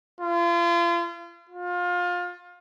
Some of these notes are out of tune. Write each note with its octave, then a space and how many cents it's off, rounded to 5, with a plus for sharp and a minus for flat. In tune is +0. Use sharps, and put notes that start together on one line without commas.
F4 -35
F4 +25